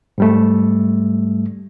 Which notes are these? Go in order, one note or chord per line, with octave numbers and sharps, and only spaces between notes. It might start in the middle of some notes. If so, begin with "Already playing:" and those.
G#2 G3 A3